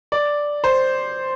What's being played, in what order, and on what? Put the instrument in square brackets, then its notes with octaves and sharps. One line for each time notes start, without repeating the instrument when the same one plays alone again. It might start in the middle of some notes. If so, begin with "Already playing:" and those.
[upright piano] D5
C5